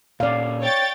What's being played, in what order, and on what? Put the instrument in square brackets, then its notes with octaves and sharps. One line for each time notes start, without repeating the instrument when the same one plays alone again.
[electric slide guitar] A#2 C#4 [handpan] D5 F5
[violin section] C#5 G5 A6